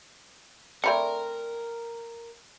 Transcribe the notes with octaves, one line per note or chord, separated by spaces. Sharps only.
A3 C4 D4 A#4 D5 B5 C#7